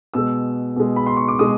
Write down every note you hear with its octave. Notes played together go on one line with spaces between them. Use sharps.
B2 G#3 E6
B2 G#3
B5
C6
C#6
D6
B2 G#3 D#6